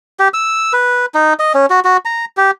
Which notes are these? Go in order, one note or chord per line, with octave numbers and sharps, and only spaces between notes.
G4
E6
B4
D#4
D#5
C#4
F#4
F#4
A#5
G4